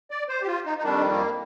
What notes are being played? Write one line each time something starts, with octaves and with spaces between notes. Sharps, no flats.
D5
C5
G4
F4
D#4
D#4
F2 D#3 G3 D4
A#3